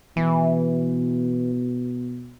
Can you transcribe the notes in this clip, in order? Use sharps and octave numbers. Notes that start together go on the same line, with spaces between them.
B2 E3